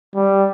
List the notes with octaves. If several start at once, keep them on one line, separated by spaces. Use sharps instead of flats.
G3